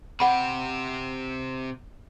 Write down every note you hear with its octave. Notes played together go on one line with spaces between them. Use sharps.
C3 G4 F#5 B5